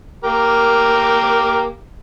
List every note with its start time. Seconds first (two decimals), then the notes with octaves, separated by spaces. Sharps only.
0.24 A#3 G4 A#4